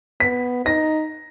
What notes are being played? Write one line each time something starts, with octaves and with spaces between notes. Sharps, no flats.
B3 B6
D#4 A#6